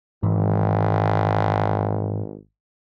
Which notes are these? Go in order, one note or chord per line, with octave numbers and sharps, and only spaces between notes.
G#1 G#2 E3